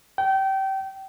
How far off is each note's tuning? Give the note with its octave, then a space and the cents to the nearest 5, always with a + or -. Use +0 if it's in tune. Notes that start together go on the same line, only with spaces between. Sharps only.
G5 -25